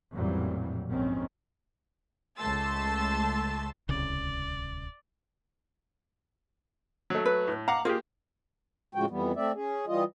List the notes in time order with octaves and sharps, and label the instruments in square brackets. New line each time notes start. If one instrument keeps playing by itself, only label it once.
[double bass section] A1 F2 A#2 E3 F#3 G3
A#1 F2 G#2 D#3 C4 C#4
[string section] C#2 A3 A5 C6 E6 A6
[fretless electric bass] D1 C2 C#3 [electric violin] D5
[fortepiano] F#3 A3
[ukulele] B4
[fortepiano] A2
[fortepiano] F5 F#5 D6 [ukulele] A#5
[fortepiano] A#3 G4 [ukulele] F4 G#4
[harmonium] A2 C#3 F3 G#3 F#4 G5
F2 E3 G3 B3
A3 C4 D5 E5
C#4 G#4
E3 G3 F4 D#5